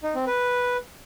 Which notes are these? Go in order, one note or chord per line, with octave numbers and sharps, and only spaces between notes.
D#4
C4
B4